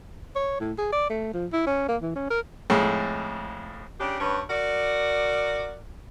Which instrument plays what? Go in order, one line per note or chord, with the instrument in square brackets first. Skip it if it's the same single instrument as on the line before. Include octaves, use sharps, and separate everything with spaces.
[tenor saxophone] C#5
A2
G#4
D5
A3
F3
E4
C#4
A#3
E3
C#4
A#4
[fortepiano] F2 A2 G#3
[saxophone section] C#3 D4 G4
G2 C#4 B4 C#5
F#4 A#4 D5